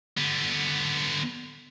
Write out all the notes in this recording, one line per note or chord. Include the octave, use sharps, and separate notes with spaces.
D3 B3